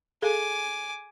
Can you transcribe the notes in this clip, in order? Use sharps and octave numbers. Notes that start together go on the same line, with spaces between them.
G#4 A4 F5 G#5 D6